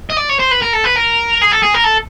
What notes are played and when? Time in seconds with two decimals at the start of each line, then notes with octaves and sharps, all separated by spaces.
0.10 D#5
0.17 D5
0.29 C#5
0.40 C5
0.52 B4
0.62 A#4
0.74 A4
0.85 B4
0.96 A#4
1.42 G#4
1.52 A4
1.63 G#4
1.75 A#4
1.85 A4